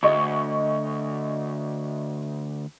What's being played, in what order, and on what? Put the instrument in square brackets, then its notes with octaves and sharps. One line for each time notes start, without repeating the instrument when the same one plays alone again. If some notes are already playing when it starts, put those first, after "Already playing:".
[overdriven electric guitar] D2 [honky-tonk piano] D#5 C#6